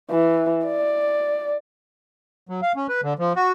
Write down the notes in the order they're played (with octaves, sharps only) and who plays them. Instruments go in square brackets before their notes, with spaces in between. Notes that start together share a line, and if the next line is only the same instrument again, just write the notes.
[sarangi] E3
D5
[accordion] F#3
F5
C#4
B4
D3
F3
F#4